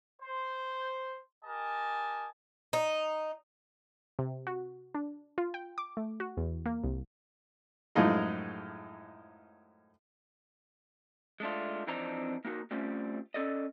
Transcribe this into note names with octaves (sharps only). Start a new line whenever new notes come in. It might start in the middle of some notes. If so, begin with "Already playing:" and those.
C5
G4 A#4 D#5 G#5 A5
D#4
C3
F#4
D4
F4
G5
D6
A3
F#4
E2
A#3
C2
F#2 A2 F3 G#3 D#4 F4
G#3 A3 D4 F4
F2 E3 C4 D4 D#4 A#5
A#3 D#4 F#4 A#4
G3 A3 C4 C#4 F4
C#4 A4 D5 D#5